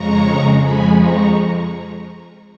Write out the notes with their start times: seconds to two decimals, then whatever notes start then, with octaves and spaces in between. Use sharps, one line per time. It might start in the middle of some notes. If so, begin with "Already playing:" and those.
Already playing: F2 C#3 G#3 A#5 C#6
0.61 F2 F3 G#3 G#5 B5
0.97 A#5 C#6